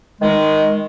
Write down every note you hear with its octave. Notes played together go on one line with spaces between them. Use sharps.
D#3 G#3